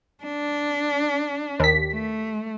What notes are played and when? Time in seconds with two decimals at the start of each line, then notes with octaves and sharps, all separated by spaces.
0.24 D4
1.60 D#2 B6
1.93 A3